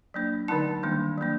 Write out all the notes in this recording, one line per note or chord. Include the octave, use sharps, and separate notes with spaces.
F#3 A#3 D4
D3 F#3 A3 D#4 A5
D#3 G3 A#3 D4
F#3 A#3 D4